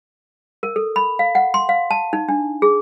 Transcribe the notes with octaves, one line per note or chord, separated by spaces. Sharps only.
A#4
A4
B5
F5
F#5
C6
F5
A5
D#4
D4
G#4